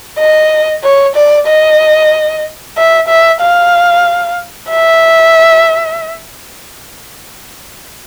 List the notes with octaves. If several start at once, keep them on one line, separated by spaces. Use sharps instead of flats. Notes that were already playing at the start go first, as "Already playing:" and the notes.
D#5
C#5
D5
D#5
E5
E5
F5
E5